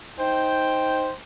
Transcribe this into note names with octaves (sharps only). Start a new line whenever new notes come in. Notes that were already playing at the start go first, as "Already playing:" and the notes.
D#4 C5 G5